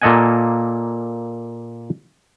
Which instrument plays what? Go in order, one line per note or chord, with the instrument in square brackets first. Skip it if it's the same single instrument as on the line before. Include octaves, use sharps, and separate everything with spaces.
[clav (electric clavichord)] A#2 A#3 A4 D#5 F#5 G#5